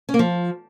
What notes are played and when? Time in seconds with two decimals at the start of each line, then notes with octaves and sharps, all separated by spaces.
0.09 C#4
0.14 A#3
0.19 F3